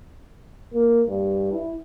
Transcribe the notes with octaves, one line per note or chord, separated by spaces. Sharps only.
A#3
G2
E4